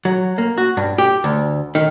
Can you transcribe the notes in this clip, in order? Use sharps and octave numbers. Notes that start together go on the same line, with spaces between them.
F#3
A#3
F#4
G2
G4
D2
D#3